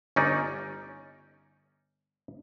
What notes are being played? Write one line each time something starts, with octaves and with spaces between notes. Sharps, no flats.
G1 C#4 D#4 D5